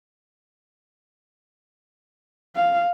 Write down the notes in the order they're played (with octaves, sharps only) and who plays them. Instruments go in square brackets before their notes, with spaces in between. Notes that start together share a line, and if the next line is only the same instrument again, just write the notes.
[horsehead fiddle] F5